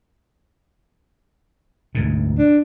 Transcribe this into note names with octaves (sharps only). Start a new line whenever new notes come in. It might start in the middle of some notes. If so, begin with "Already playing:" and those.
D2 G#2 B2
D4